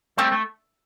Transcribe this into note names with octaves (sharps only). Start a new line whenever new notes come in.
G3 A3 C4
A3